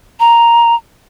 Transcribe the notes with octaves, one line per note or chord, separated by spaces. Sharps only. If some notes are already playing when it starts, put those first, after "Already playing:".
A#5